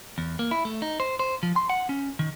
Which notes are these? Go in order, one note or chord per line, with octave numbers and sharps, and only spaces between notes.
E2
A#3
E4
A3
D#4
C5
C5
F3
C6
F#5
C#4
D#3